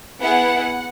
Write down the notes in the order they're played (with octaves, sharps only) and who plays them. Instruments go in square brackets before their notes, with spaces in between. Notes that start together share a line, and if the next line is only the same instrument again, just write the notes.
[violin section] B3 E4 G#4 F#5